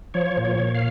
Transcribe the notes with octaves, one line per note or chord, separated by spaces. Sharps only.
F3 C#5
A#2
C#5
A#2
F5